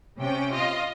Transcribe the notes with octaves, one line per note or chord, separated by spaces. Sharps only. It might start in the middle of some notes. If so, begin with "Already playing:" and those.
C3 C#4 G5
F4 D#5